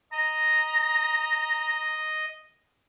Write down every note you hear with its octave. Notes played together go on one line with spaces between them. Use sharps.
D#5 A#5